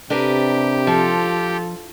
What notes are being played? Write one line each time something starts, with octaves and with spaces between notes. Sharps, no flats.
C3 D4 G4 A#4 B4
F3 F4 A4